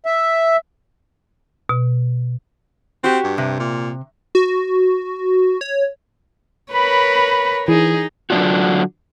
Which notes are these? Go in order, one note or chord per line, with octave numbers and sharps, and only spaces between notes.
E5
B2
C4 F#4 G4
G2
C3
A#2
F#4
C#5
A#4 B4 C#5 B5
E3 D#4 G#4
D3 F#3 C4 D4 F4 F#4